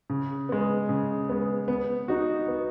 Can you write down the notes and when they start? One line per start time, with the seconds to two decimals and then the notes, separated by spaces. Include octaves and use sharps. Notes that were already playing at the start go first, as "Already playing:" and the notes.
0.10 C#3
0.49 G#3 B3
0.89 C#3
1.29 G#3 B3
1.68 B3
2.08 D#4 F#4
2.48 B3